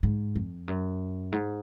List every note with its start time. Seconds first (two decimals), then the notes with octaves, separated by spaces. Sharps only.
0.03 G#2
0.36 F2
0.68 F#2
1.32 G#2